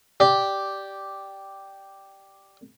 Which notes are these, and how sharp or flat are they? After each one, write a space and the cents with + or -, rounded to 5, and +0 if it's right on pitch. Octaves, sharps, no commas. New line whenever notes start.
G4 -5 D5 +0